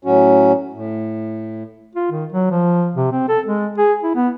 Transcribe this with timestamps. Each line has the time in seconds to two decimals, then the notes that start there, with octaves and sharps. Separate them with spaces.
0.05 A2 F#3 C#4 F#4
0.73 A2
1.95 F4
2.11 D#3
2.32 F#3
2.50 F3
2.95 C3
3.12 C4
3.28 A4
3.46 G#3
3.78 G#4
4.03 E4
4.15 B3